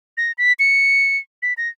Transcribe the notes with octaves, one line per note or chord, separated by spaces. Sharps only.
A#6
B6
C#7
B6
A#6